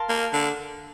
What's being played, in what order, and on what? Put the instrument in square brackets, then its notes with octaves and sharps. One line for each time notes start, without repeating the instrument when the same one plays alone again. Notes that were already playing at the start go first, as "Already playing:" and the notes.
Already playing: [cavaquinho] A#4 F5 A5 C6
[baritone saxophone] A#3
D3